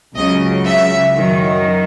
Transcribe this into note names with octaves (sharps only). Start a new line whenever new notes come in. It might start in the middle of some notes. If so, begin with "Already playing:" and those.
C#2 C#3 F#3 D#5
E5
F#2 D#3 F#3